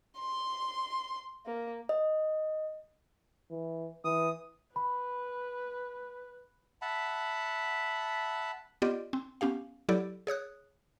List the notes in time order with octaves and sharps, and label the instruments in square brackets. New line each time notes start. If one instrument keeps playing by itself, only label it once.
[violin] C6
A#3
[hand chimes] D#5
[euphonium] E3
[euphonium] E3 [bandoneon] D#6
[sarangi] B4 [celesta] B5
[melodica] E5 F#5 A5 B5
[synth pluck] B3 F4 G4 D5 D#5
C4
B3 C#4 G4 F5
F#3 E4 G4 A4 D5
G#4 C#5 D#6 F#6